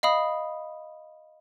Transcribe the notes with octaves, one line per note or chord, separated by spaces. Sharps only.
D#5 F5 B5 D#6